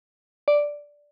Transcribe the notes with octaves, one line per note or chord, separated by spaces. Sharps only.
D5